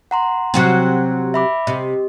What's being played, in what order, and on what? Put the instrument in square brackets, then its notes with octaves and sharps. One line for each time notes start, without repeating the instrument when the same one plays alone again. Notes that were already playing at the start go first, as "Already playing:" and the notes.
[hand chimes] F#5 A#5 C6
[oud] C3 F#3 C4
[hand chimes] E5 B5 D6
[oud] C3 [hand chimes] D#5